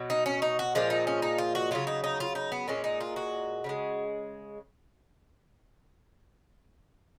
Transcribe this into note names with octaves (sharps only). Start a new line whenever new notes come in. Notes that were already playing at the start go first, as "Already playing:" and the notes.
Already playing: B2 F#3
D#4
C#4
D#4
F#4
A#2 F3 G#3 F4
D#4
C#4
D#4
F4
F#4
C#3 F#3 F4
D#4
D#4
F4
D#4
B3
A#2 G#3 C#4
D#4
F4
F#4
C#3 F3 G#3